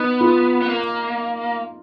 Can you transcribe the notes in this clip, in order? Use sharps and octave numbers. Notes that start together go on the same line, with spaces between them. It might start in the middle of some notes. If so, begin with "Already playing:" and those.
Already playing: B3 D#4
F4
B3
A#3